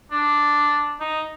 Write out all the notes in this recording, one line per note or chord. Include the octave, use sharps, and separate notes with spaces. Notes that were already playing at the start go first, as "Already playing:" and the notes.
D4
D#4